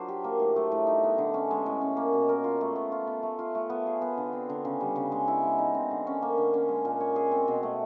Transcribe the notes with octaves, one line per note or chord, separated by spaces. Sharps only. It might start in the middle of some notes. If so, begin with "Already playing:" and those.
Already playing: F#3 D4 F4 C5
G4
A#3
A2
A3
A2
D#4
B3
D3
C#4
G#3
A2
C#4
A#3
B2
A#4
F4
A3
B3
F4
B3
A3
F4
A3
B3
G#4
B3
D3
C4
D3
C#3
G3
C#3
G#3
E4
G#3
D#4
C4
D3
C#4
A#3
D3
C#4
G#3
A#2
C#5
G#4
C4
B2
A3